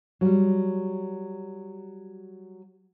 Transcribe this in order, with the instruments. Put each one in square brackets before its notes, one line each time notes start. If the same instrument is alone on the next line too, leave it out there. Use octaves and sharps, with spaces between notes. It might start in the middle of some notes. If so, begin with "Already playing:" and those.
[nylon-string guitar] F#3 G3